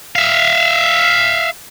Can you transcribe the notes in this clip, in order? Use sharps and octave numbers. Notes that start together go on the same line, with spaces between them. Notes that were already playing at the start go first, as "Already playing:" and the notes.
E5 F5